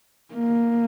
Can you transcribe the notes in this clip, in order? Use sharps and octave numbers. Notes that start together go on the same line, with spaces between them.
A#3